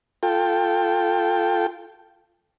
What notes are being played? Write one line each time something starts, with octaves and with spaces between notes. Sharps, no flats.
F4 A4 G5